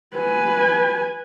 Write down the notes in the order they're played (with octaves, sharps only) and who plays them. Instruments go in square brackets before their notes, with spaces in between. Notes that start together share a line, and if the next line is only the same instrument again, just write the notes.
[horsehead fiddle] B4 G#5